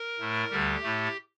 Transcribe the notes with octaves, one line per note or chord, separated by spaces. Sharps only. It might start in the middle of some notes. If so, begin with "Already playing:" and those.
Already playing: A#4
A2 A3
D2 D3 G3 G4
A2 A3